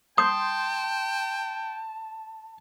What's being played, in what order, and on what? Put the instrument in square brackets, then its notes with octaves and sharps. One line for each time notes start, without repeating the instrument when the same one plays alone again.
[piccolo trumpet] G5 [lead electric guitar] A5 [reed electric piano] C6 G6 [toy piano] D#6